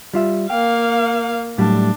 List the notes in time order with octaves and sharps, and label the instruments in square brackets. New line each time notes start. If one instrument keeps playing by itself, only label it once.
[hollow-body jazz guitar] G3 F4 E5
[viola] A#3 F5 [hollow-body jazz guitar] G5
[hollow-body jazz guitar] A2 F#3 G3 [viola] D4